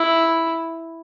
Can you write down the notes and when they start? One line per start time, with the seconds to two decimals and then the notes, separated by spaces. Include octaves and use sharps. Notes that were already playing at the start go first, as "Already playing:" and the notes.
Already playing: E4